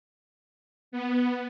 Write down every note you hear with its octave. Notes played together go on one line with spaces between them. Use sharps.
B3